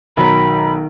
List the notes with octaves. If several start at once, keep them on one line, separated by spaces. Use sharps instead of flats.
B1 D#3 F#3 A#5 B5